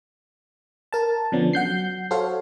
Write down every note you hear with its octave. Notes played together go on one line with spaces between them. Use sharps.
A#4 A5
D3 F3 B3 C#4 D4
F#3 F#5 G6 C7
F#4 A4 C5 C#5 F5